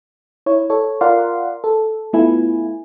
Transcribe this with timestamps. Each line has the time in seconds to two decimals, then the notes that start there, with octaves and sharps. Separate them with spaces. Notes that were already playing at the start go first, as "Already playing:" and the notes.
0.46 E4 C#5
0.70 A4 C#5
1.01 F4 A#4 D5 F5 F#5 C6
1.64 A4
2.13 A3 B3 E4 F4 G#5